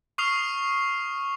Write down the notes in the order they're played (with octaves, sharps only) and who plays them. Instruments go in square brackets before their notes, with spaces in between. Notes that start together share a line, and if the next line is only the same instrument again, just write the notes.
[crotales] C#6 D#6 F6 C7 F7